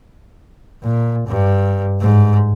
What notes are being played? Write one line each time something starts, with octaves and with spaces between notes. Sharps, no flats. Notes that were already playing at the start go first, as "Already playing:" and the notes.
A#2
G2
G#2